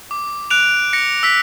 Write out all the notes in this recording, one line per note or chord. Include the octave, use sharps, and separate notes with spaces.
D6
F#6 D7 F7
A#6 C#7
E6 B6